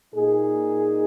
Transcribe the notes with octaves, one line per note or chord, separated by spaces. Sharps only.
A#2 A#3 D#4 G#4